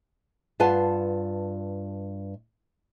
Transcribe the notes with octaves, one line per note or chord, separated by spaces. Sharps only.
G2 F4 B4 F#5 G#5 A5